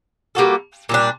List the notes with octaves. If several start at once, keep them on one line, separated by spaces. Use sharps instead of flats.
G3 A#3 F#4 A4
A#2 G3 D4